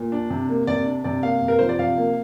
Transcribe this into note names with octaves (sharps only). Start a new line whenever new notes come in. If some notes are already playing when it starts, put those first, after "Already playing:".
Already playing: A#2
D4
C3
A#3
C3 D5
D4
C3 D5
A#3 F5
C3
A#4
F3 C5
D5
C3 F5
A#3